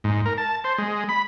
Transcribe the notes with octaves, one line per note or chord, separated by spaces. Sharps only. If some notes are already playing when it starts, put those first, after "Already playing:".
G#2
A#4
A5
C5
G#3
B5